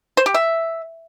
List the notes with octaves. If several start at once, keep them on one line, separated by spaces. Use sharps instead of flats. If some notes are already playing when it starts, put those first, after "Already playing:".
C5
G4
E5